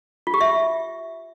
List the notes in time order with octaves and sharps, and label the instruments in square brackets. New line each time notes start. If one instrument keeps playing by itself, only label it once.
[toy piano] F4
G4
E5